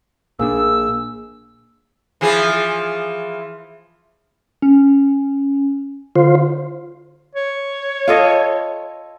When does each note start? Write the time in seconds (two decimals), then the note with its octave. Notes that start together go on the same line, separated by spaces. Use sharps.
0.39 A#1 A#2 A#3 D4 G#4 E6
2.21 E3 F3 G#4
4.62 C#4
6.16 D3 F4 C5
7.35 C#5
8.08 F4 A4 D#5